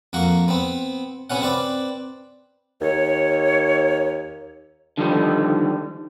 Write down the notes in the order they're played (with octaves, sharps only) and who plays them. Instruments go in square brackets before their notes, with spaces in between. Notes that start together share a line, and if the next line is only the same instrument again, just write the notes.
[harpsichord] F2 A#3 F#5 C#6
B3 C4
C3 B3 C#4 F#5
C4 B4 D5
[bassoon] D#2 [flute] C#5
[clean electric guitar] D3 D#3 F3 G3 D#4